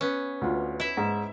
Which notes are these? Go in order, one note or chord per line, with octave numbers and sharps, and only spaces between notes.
B3 C#4
D2 F4
E4 E5
G#2